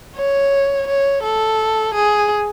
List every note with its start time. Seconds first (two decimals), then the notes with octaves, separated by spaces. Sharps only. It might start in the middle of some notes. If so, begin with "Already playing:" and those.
0.16 C#5
0.88 C#5
1.23 A4
1.95 G#4